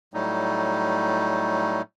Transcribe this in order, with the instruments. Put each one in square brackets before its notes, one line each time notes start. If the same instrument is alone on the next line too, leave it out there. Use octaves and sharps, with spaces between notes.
[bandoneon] A2 F#3 G3 A3 D#4